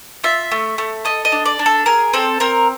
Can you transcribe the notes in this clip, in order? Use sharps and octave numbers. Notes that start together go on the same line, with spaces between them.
F4 E5
A3
A3
A4 D#5
D#5
D4
D5
D4
A4
G#4 A#4
C4 A4
C4 A#4